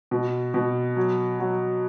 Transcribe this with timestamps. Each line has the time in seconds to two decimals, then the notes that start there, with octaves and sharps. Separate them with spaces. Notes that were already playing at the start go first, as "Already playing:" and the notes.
0.11 B2
0.54 B2
0.97 F#3
1.40 F#3